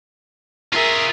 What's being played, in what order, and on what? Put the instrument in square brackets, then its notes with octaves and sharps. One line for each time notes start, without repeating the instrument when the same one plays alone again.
[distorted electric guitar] F4 G#4 [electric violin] A#4 E5